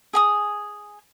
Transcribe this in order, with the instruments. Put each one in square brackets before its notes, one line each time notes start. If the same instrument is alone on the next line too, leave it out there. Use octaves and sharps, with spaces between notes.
[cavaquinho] G#4 G#5 D#6